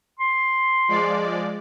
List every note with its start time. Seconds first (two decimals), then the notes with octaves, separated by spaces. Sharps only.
0.19 C6
0.88 F3 G#3 D5